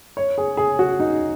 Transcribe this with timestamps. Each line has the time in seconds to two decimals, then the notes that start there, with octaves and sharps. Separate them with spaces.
0.17 C#5
0.38 G#4
0.57 G#4
0.79 F#4
1.00 D#4